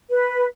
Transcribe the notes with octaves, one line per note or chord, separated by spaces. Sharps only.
B4